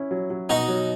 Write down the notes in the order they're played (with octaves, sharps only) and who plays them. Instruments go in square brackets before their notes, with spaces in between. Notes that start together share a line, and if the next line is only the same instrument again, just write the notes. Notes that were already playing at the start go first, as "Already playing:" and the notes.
Already playing: [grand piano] C#4 E4
F#3
F#3
[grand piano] B2 [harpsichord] D#4 F#4
[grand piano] F#3